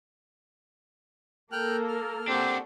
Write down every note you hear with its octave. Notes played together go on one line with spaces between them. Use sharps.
A#3 A4 A#4 G5 F6 F#6
F6
C4 D4 F#4 G4